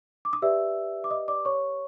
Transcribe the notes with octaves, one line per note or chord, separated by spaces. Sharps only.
D6
D#6
G4 B4 D5 E5 E6
D6
D#5 D#6
D5 D6
C#5 C#6